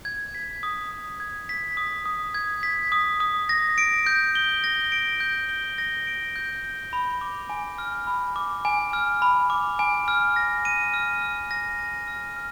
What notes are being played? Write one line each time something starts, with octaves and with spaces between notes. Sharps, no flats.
G#6
B6
D#6
D#6
G#6
B6
D#6
D#6
G#6
B6
D#6
D#6
A#6
D7
G6
G7
A#6
D7
G6
G7
A#6
D7
G6
G7
B5
D6
G#5
F6
B5
D6
G#5
F6
B5
D6
G#5
F6
A#6
D#7
F6
F6
A#6
D#7
F6
F6